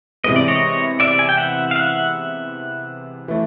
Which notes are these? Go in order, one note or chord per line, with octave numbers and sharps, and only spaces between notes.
C3 E3 G#3 B3 D#5
D5
C#5 D#5
D5 E5
G#5
G5
E5 F#5
F5
E5 F#5
E3 A3